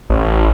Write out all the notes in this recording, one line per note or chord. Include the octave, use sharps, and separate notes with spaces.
A1